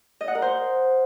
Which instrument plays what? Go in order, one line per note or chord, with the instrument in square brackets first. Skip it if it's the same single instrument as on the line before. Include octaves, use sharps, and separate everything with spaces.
[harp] D#5
F#5
A#4
C5